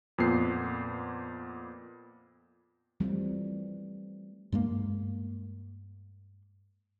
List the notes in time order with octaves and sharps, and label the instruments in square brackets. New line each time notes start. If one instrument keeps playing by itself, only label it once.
[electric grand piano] F2 A#2 B3 C7
[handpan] E3 F3 G3 A3 C4
[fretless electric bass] G2 G#3 A#3